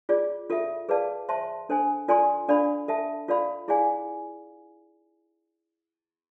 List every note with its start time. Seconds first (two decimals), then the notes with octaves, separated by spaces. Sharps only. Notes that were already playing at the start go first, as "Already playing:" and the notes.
0.09 F4 G#4 D5
0.50 F4 A4 E5
0.89 G#4 B4 D5 F5 A5
1.29 C5 E5 A5 C6
1.69 D4 A4 C5 G#5
2.08 F4 A4 D5 G#5 C6
2.48 D4 A4 D5 F5 B5
2.88 A4 E5 A5
3.28 F4 A4 D5 F5 B5
3.68 E4 G#4 D5 F5 G#5